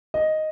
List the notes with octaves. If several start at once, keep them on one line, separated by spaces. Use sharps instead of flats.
D#5